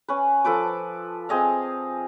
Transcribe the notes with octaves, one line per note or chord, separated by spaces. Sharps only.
C#4 B4
F3 A4 B4 D6
C4 G#4 D#5 F5